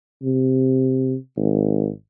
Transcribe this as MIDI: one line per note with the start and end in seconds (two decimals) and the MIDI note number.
0.23 1.15 48
1.37 1.89 32